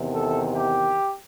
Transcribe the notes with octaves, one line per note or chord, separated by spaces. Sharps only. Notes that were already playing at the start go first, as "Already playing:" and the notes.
Already playing: E2 C3 D#3
A4
G4